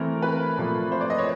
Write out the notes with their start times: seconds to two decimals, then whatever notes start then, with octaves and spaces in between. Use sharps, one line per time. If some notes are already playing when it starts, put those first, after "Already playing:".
Already playing: E3 A3 C4 A#4
0.22 B4
0.58 A#2 F3 A3 C4
0.92 C5
1.01 D5
1.10 D#5
1.18 C#5